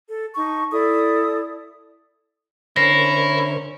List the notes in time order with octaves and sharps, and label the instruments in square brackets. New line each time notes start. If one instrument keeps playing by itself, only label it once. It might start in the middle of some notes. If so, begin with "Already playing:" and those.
[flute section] A4
D#4 A5 C#6
E4 A4 D5 D#6
[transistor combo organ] D3 A#4 C5 [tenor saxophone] C#4 [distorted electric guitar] E4 [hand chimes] A#6 C7